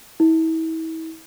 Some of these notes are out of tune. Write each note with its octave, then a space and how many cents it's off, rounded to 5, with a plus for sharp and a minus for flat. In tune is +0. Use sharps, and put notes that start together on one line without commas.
E4 -35